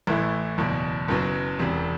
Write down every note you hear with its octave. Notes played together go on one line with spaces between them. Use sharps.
A1 A2 E3 A3 E4
F#1 E2 B2
F#1 F#2 F#3 B3
E1 E2 C3